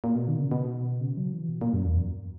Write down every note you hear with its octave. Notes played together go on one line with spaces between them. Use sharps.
A#2
B2
D#3
C#3
B2
C#3
F#3
E3
B2
A#2
F#2
E2
F#2